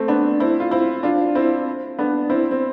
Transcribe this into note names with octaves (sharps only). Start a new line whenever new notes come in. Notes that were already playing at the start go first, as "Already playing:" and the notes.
Already playing: A3 C4
B3 D4
C4 E4
F4
C4 E4
D4 F4
C4 E4
B3 D4
C4 E4
C4